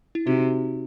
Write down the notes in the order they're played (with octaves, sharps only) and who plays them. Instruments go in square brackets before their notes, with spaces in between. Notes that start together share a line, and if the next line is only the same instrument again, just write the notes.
[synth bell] E4
[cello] C3 [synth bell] D#4 F#4